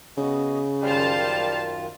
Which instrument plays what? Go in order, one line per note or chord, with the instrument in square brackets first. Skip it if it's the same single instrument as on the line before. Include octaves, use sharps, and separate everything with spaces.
[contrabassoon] C#3 [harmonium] B3 F#4 D#5
[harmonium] F#2 D#3 F4 [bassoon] G3 [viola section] C5 F5 A5